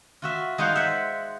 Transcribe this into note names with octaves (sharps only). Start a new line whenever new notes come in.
F4 F#4 E5
G#3 D#4 F4 C5 F5 F#5
E5 F#5